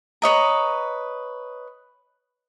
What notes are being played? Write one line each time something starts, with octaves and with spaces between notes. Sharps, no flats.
B4 C#5 D#5 A#5